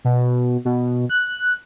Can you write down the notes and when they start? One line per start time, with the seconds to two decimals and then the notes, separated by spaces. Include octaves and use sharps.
0.05 B2
0.65 B2
1.10 F#6